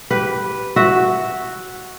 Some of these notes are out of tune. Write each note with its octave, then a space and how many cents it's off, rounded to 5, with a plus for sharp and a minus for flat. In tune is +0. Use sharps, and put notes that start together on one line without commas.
G4 -15 B4 +0
F#4 +0 E5 -10